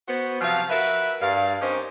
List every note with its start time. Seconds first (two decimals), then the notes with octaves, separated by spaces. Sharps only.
0.08 B3 F#4 C5
0.41 C3 F3 F#3 F5
0.70 F#4 A#4 B4 E5
1.21 G2 F5
1.62 C4 C#4 D#4 G4 A#4 C5